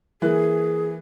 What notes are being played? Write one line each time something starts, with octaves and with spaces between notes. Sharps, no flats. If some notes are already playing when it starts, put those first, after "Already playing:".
E3 A#3 G#4 F#6